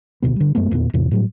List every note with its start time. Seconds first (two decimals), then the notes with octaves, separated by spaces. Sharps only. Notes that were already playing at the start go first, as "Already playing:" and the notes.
0.22 D#1 D2 B2 B3
0.36 D3 G3
0.55 F#2 G#3 A3 B3
0.71 D1 E2 A#2 B3
0.93 E2 A2 C3
1.11 A2 F#3 G3